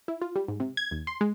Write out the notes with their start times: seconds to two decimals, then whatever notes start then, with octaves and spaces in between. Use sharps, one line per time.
0.08 E4
0.22 F4
0.36 G3
0.48 G#2
0.60 C3
0.77 G#6
0.91 D#2
1.07 C6
1.21 G#3